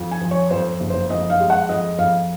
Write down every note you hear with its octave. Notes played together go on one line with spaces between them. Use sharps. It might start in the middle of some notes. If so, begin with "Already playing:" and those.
Already playing: F2
G#5
F3
C#5
F2 C5
F#1
C5
F2 D#5
F5
G#3
F#5
F2 D#5
F2 F5